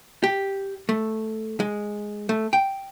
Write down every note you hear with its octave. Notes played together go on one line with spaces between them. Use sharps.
G4
A3
G#3
A3
G5